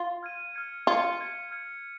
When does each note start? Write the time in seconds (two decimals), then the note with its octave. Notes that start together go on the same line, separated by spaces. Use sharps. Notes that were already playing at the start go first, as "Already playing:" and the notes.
Already playing: F4
0.23 F6 G#6 D#7
0.55 F6 G#6 C#7
0.86 F4 F6 G#6 C#7
1.19 F6 G#6 C#7
1.51 F6 G#6 C#7